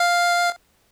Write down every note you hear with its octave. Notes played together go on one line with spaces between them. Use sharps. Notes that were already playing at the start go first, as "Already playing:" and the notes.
Already playing: F5